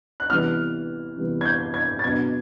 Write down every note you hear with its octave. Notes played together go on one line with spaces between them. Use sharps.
F#6
C3 E3 G3 B3 F6
C3 E3 G3 B3
G#6
G6
G#6
A6
B2 F#3 B3 D4 G#6